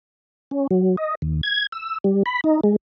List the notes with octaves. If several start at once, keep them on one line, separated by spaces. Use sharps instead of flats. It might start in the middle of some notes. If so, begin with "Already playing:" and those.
C#4
F#3
D#5
D#2
G#6
E6
G3
B5
D#4
G#3